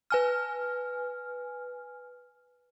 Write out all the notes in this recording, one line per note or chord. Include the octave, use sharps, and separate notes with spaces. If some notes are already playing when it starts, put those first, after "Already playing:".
B4 G#5 F6